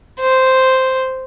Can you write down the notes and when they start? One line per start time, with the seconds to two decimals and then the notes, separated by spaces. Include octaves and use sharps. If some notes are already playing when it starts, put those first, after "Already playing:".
0.20 C5